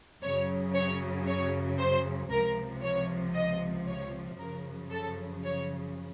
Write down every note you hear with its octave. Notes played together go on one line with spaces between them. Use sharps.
F#2 C#3 F#3 C#5
C#5
C#5
C5
C#2 C3 F3 A#4
C#5
D#5
C#5
F#2 C#3 F3 A#4
A4
C#5